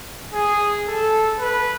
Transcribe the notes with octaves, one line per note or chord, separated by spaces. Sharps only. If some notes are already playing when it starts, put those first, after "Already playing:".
G#4
A4
B4